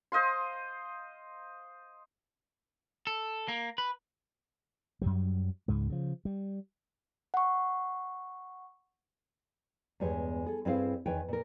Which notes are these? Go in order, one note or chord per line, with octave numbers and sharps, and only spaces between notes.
C5 D#5 F5 C6
A4
A#3
B4
F#2 F#3 G3
C#2 G#2 G#3
C#3 F3
G3
F#5 C#6
E2 G2 G#3 G4 C#5
G#4 A4
G2 C4 E4 G#4 C5 F5
E2 D#3 B4 C#5 G5 G#5
A#2 A#4